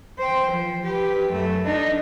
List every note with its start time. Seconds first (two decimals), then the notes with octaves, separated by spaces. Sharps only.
0.18 C5 G5
0.50 F3
0.84 G4 B4
1.29 F#2 A3
1.65 D4 D#4